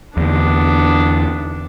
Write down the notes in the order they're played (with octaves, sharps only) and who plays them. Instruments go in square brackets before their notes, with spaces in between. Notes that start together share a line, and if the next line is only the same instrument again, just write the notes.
[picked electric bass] E2 D3 [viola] B3 D4